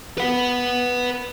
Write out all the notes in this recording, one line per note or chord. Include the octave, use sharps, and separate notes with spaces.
B4 F#5